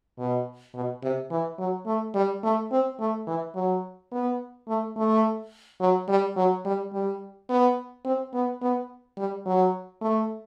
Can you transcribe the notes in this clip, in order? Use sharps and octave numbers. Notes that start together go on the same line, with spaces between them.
B2
B2
C3
E3
F#3
A3
G3
A3
C4
A3
E3
F#3
B3
A3
A3
F#3
G3
F#3
G3
G3
B3
C4
B3
B3
G3
F#3
A3